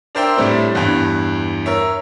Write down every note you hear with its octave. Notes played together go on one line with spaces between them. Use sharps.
D4 A#4 C5 D5 E5 G5
A2 G3 A3 C4 D4
E2 G2
A#4 C#5 E5